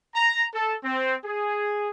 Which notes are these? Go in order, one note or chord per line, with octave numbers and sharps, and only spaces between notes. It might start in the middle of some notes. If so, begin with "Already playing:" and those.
A#5
A4
C4
G#4